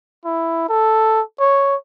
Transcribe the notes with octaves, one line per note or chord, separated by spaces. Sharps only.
E4
A4
C#5